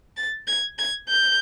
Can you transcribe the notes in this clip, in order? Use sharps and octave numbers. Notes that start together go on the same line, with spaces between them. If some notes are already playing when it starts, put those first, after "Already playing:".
A6
G#6
G#6
G6